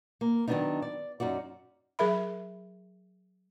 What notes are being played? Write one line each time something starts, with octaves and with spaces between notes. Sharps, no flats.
A#3
D#3 F#3 A3 B3 D4 D#4
D5
F#2 D#4 F#4 D5
F#3 G#4 A#4 E5 B5